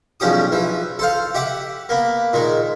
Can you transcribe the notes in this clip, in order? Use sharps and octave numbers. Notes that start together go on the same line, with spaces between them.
B1 E2 F3 C#4 G4 D#6
E3 F3
A4 C5 F5
G4 E5 F#5 D6
A#3 B3
A#2 D#3 G#3